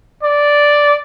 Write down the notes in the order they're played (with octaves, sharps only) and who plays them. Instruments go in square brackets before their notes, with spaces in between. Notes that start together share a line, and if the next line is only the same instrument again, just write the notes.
[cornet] D5